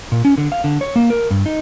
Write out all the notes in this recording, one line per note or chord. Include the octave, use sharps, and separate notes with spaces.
A#2
C#4
D3
F5
D3
C#5
A#3
A#4
G2
D#4